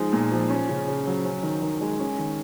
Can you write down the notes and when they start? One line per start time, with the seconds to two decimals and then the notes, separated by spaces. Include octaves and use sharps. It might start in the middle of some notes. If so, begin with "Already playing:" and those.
Already playing: F3 G#3 D#4
0.13 A#2
0.31 F3
0.50 C#4
0.69 C#3
0.88 C#3
1.07 F#3
1.25 C#4
1.43 D#3
1.62 D#3
1.81 G#3
2.00 C#4
2.18 D#3